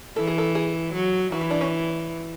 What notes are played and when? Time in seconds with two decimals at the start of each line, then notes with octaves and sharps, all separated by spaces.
0.16 E3 A4
0.27 G#4
0.38 A4
0.55 G#4
0.94 F#3
1.32 E3 F#4
1.41 E4
1.51 D4
1.61 C#4